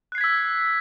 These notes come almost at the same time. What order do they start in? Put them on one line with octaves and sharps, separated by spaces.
F#6 C7 G#6 B6 E6